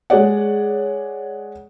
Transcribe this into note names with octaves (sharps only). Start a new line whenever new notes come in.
G#3 G#4 C#5 D5 F#5